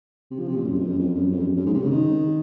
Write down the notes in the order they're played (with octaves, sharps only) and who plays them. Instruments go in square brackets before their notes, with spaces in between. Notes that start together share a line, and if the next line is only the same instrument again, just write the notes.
[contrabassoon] C3
F3
C3
A#2
F#2
F2
F#2
F2
F#2
F2
F#2
F#2
G#2
C3
C#3
D#3